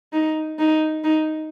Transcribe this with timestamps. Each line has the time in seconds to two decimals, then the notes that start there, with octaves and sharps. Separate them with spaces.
0.13 D#4
0.59 D#4
1.04 D#4